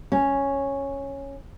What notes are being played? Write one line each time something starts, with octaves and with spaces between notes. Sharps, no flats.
C#4